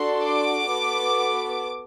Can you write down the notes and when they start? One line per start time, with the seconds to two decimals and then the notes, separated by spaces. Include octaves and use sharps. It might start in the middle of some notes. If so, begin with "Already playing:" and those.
Already playing: D4 F#4 A4 C6
0.23 D6
0.69 B3 F#4 A4